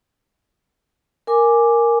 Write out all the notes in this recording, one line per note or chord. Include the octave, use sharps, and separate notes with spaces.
A#4 G#5 D6